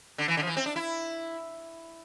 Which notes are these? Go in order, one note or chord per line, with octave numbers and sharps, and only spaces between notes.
D3
E3
D3
F3
E3
C4
D4
E4